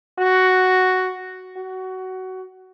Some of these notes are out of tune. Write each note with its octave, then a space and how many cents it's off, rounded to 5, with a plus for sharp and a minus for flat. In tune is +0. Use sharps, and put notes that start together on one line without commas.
F#4 +5
F#4 +20